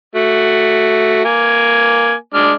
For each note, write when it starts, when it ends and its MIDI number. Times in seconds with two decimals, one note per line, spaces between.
0.15 1.24 57
0.15 1.24 66
1.25 2.14 58
1.25 2.14 80
2.34 2.52 56
2.34 2.52 62
2.34 2.52 89